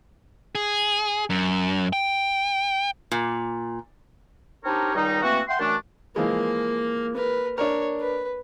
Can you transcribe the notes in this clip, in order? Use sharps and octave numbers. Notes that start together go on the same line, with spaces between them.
G#4
F#2
G5
A#2
C4 D4 D#4 G4 A#4 C#5
C#2 D#3 G3 D#4
E3 A3 A#3 C4 F#4
E5 F#5 G5 C6
F#2 E3 A3 D4
E3 F3 G#3 A#3 A#4
A#4 B4
D4 A#4 C#5
B4